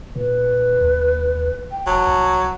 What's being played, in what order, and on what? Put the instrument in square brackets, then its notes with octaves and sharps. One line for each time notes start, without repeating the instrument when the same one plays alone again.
[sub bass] A#2 [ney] B4
[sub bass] D#2
[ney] G5
[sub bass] F1 [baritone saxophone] F#3 [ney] A5
[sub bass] C2